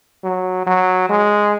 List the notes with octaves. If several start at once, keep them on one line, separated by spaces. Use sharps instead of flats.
F#3
F#3
G#3